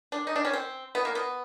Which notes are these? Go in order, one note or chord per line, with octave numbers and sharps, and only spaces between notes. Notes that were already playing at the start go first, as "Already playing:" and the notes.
D4
D#4
D4
C#4
C4
B3
A#3
B3